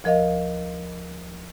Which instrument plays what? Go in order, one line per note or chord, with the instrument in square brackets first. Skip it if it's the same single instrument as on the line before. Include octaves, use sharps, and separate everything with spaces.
[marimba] D2 F3 A#4 D#5 F5